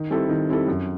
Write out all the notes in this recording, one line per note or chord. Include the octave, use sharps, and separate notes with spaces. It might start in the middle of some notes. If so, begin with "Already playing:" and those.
Already playing: D#3
G3 C4 E4 A4
D#3
G3 C4 E4 A4
F#2